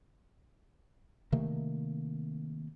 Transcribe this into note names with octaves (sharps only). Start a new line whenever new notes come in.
C3 D#3 A3 A#3